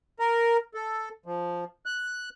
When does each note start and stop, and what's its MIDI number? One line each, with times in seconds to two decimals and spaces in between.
0.19 0.57 70
0.74 1.09 69
1.26 1.64 53
1.86 2.29 90